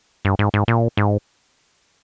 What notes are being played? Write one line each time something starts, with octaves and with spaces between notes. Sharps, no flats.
G2
G#2
G#2
A#2
G#2